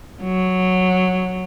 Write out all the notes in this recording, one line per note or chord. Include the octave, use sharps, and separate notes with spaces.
F#3